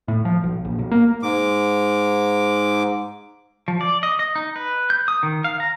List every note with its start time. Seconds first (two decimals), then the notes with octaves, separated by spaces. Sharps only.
0.08 A2
0.25 F3
0.43 B1
0.65 A#1
0.79 B1
0.91 A#3
1.23 G#2 D6
3.68 F3
3.81 D5
4.03 D#5
4.19 D#5
4.35 D#4
4.56 B4
4.90 G6
5.08 D#6
5.23 D#3
5.44 F5
5.60 A#5